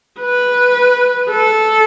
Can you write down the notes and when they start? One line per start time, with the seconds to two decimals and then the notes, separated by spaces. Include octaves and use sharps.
0.20 B4
1.31 A4